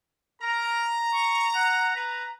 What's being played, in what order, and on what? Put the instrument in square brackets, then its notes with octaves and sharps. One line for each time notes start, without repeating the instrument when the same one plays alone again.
[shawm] A#4 [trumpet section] A#5
[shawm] C#6
F#5
B4